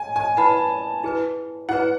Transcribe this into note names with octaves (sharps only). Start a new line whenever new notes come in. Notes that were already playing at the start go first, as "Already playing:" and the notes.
Already playing: G#5
G#5
E4 B4 F#5 A5 B5
E4 G#4 B4
E4 G#4 B4 F#5